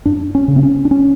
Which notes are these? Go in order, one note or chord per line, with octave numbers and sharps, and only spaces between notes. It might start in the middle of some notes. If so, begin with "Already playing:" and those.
F#2 D4
C#4
C#3
C4
C#4
D4
C#4